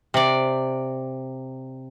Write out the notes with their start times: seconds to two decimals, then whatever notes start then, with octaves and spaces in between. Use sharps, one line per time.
0.14 C3 D5